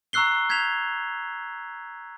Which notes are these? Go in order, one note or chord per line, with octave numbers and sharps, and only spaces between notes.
A#5 C#6 E6 F#6 C7 G7
G6 G#6 B6 E7 F7